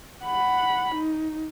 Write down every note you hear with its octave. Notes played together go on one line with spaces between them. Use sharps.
F#5 B5
D#4